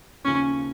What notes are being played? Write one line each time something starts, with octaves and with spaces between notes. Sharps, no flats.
D#2 C#3 F3 C#4